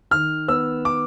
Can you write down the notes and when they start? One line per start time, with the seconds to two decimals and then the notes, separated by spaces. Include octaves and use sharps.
0.11 D#3 F6
0.48 B3 E6
0.85 D6